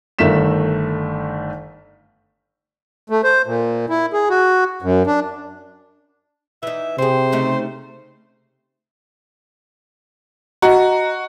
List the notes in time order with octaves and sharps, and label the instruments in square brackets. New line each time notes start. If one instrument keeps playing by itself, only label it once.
[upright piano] G1 D#3 A3 A#4 B6 E7
[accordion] A3
C5
A#2
E4
G#4
F#4
F#2
D4
[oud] E3 D#4 [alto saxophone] E5
[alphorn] C3 [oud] C4 G#4 [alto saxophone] C5
[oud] C#3 A3 D#4
[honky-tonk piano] F#4 [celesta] D#5 A#5